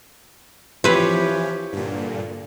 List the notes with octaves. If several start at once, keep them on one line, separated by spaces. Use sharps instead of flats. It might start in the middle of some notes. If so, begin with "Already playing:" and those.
E3 F3 C4 G4 B4 C#5
G2 A#2 D3